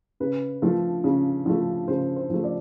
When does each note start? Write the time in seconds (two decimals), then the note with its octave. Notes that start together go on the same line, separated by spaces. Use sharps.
0.20 C#3 B4
0.62 F3 A3
1.04 C#3
1.46 F3 A3
1.88 C#3 C5
2.16 C5
2.30 F3 A3
2.44 D5